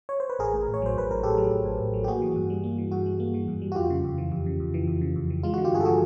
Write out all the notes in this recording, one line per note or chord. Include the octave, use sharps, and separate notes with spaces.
C#5
C5
B4
A1 G#4 A#4
A2
A1
C#5
F#3 C5
A1 B4
A2 A#4
A1 G4 A4
F#3
A1
A2
A1
F#3
G4
A#3 F#4 G#4
E3
G2
G3
A#3
E3
G2 F#4
G3
A#3
E3
G2
G3
F#4
F2 F4 G4
C#3
F2
E3
F2
C#3
F2
E3
F2
C#3
F2
E3
G#3 F4
F#4
D3
F4 G4
G2 F#4 G#4
A4
F3 F#4 G#4